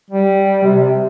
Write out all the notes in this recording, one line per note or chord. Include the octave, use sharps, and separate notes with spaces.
G3
C3